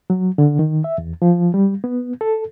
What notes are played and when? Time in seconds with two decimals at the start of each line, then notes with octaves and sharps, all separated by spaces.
0.10 F#3
0.38 D3
0.59 D#3
0.84 E5
0.98 E2
1.22 F3
1.54 G3
1.84 B3
2.21 A4